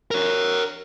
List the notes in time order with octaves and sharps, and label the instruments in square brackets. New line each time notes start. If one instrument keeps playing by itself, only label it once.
[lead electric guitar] A#4 C#5